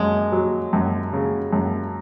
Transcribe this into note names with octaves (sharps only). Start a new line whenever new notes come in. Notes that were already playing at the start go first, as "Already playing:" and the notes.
Already playing: F#2 G#3
F#3
F#2
C#3
F#2